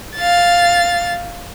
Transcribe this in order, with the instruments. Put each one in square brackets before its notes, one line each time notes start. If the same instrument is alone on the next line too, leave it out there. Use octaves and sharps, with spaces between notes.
[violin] F5 A6